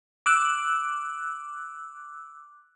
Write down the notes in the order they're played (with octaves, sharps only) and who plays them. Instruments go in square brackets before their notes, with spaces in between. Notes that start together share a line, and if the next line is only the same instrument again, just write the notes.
[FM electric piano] D6 E6 F#6